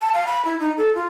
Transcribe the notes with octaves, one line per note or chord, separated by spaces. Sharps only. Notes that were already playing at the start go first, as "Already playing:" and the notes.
A5
F5
B5
E4
D#4
A4
F4